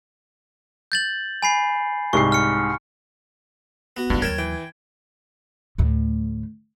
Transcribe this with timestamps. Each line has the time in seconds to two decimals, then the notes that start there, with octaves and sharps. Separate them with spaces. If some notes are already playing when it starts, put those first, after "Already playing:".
0.92 G6 A6 F#7
1.43 G#5 B5 C7
2.13 C2 G#2 C#6 C7
2.32 F6 C#7
3.97 B3 F#4
4.10 G2 D#4 E4
4.22 D#2 F#3 A#4 C#5 G5 A5 G#6
4.38 E3 G5
5.78 D2 A2